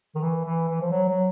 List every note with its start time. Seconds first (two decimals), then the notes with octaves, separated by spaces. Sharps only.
0.15 D#3
0.22 E3
0.45 E3
0.69 E3
0.81 F3
0.91 F#3
1.09 F#3